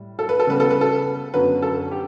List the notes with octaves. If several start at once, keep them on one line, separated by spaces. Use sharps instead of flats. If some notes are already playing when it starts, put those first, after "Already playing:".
Already playing: A2 G3
A4
B4
A4
C#3 G3 B3 B4
A4
B4
A4
F#2 D3 F#3 B3 B4
A4
G4